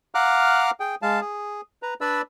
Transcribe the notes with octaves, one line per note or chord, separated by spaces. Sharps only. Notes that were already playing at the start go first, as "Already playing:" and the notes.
F5 F#5 A#5 D6 F6 F#6
G#4 G5
G#3 F5 A5
G#4
B4 A#5
D4 B4 D5 B5 E6